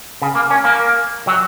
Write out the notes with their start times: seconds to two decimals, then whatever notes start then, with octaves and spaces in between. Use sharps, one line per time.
0.22 C#3
0.35 A#3
0.50 C#4
0.65 A#3
1.27 F#3